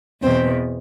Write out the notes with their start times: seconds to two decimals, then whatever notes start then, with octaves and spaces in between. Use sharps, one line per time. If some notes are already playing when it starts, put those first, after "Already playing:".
0.22 E2 B2 C4